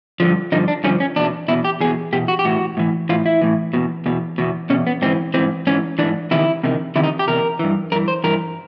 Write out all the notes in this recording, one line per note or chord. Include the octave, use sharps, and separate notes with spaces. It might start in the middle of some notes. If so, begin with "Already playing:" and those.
G2 D3 F3
G2 D3 F3 D#4
D4
G2 D3 F3 C#4
C#4
E2 B2 D4
E2 B2 E4
G4
E2 B2 G#4
E2 B2 G4
F#4
G4
A2 E3 F#4
A2 E3
A2 E3 F4
E4
A2 E3
E2 B2
E2 B2
E2 B2
E2 B2 C#4
B3
G#2 E3 C4
G#2 E3 C4
G#2 E3 C#4
G#2 E3 D4
E2 C3 D#3 E4
E2 C3 D#3
E2 C3 D#3 E4
D#4
G4
E2 C3 A#4
G2 E3
G2 E3 A#4
C5
G2 E3 A#4